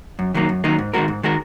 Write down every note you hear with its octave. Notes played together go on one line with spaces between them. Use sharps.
F#2
D#3 F#3 A#3 D#4
F#2
D#3 F#3 A#3 D#4
G#2
D#3 G#3 F#4 A#4
G#2
D#3 G#3 F#4 A#4